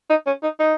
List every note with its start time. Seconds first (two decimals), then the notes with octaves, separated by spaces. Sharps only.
0.10 D#4
0.27 C#4
0.43 D#4
0.59 D#4